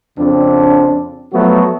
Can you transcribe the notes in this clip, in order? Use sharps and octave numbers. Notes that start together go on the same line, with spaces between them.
F2 C#3 C4 D4
F3 F#3 A3 B3 F#4